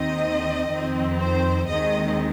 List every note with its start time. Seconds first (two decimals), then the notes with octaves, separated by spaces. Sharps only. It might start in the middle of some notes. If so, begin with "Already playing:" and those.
Already playing: D#2 D#3 C4 D#5
0.71 F2 D#3 C4
1.20 C5
1.69 D#2 D#3 G#3 C4 D#5